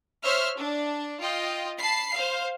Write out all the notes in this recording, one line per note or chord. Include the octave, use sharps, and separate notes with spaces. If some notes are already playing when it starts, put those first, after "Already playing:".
C5 C#5 E5 F6
D4
F4 D#5 G5
A5 B5 C7
C5 F5